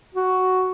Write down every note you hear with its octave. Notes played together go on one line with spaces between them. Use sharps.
F#4